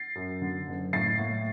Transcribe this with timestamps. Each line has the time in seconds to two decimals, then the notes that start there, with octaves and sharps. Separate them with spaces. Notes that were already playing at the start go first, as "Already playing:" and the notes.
Already playing: A6 C7
0.15 F#2
0.42 D3
0.67 F#1
0.93 A2 A6 C7
1.19 A2